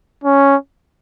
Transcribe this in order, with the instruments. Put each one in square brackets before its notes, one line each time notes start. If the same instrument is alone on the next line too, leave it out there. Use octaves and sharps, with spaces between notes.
[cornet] C#4